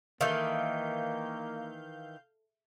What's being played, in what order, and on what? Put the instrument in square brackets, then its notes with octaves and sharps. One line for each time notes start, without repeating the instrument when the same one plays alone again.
[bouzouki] D#3 E3 [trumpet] A#3 [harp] A4 E5 [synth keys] F5 G6